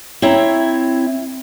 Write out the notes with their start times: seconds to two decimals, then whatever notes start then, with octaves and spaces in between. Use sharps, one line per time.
0.22 C4 E4 C#5 E5 A#5